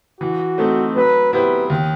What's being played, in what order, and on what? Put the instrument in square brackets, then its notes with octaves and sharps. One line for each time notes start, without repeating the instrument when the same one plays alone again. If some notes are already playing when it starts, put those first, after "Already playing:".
[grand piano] E3 [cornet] F#4
[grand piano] A3 C4 D#4 A4
[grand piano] F#3 [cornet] B4
[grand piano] B3 E4 G4 C5 [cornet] B4
[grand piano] D#2